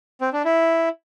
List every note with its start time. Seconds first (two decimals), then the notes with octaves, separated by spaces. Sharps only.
0.21 C4
0.33 D4
0.45 E4